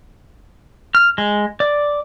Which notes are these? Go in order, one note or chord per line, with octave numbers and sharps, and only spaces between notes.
F6
G#3
D5